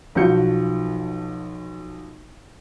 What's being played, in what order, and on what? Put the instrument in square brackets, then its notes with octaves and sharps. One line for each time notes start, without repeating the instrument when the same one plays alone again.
[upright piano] B1 F3 F#4 G6 C#7